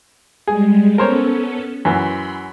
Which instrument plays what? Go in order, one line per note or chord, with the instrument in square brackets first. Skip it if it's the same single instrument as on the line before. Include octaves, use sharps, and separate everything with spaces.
[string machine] G3 G#3 [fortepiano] G#4
[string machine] B3 C#4 A4 [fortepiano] A#4 C5 C#5
[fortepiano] F#2 E3 [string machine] B5 C6